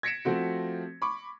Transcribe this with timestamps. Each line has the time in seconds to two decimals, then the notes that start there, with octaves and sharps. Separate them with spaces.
0.03 G#6 A#6 B6 C#7 D7 E7
0.25 F3 A3 C4 F#4
1.02 B5 C#6 D6